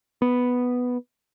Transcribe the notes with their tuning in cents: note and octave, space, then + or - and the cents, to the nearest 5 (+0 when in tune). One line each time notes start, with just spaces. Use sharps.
B3 +0